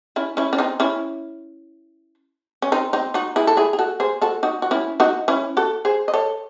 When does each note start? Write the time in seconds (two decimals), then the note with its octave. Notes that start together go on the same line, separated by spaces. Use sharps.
0.16 C#4 E4
0.37 C#4 E4
0.53 C#4
0.58 C4 D#4
0.80 C#4 E4
2.62 C#4
2.72 C4 D#4
2.93 C4 D#4
3.14 D#4 F#4
3.36 E4 G#4
3.47 A4
3.57 E4 G#4
3.73 G#4
3.79 F#4 A4
4.00 G#4 C5
4.22 F#4 A4
4.43 D#4 F#4
4.62 F#4
4.71 C#4 E4
5.00 D#4 F#4
5.28 C#4 E4
5.57 F#4 A4
5.85 G#4 C5
6.08 D#5
6.14 A4 C#5